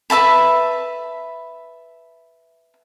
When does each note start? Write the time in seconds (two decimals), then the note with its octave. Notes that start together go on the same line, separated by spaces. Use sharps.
0.10 B4 E5 A5 B5